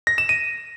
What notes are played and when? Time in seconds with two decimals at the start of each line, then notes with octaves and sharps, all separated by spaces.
0.07 A#6
0.18 E7
0.29 D#7